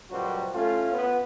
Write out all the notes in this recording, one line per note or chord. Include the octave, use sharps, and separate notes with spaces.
C#2 A#2 F#3 G3 F#4 C5
A3 C#4 F4
B3